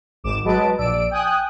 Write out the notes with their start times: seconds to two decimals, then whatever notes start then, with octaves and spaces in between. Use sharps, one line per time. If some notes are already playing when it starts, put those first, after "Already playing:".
0.24 G#1 G#2 D6 E7
0.44 F#3 G#3 B4 D#5 A5 D7
0.78 A#1 D5 E6 D7
1.11 G5 G#5 D#6 F#6